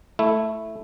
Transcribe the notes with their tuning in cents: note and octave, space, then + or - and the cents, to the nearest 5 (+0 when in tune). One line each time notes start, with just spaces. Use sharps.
A3 +0 E4 +0